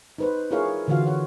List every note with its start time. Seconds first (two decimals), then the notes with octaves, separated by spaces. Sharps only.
0.18 D#4 B4 C5
0.51 E4 F4 G#4 A#4 C#5 F5
0.88 D3 E3 F4 F#4 F5
1.06 C#5 F#5